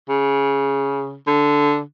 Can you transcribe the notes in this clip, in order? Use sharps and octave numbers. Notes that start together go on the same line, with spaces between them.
C#3
D3